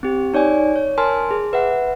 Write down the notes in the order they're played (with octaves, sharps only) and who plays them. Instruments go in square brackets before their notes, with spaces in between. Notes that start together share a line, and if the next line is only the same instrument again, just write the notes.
[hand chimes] C4 G4
D#4 C#5 D5 G#5
C#5
A#4 G#5 A5 C6 F6
G#4
B4 E5 F#5